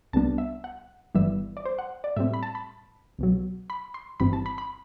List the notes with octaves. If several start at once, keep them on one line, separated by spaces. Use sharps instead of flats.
C2 C3 G3 B3 D4 A5
E5
F#5
G1 G2 E3 G3 B3 E5
D5
C5
F#5
D5
A2 G3 C4 E5
B5
A5
B5
C2 B2 F#3
B5
C6
G1 G2 E3 G3 C4 B5
A5
B5
B5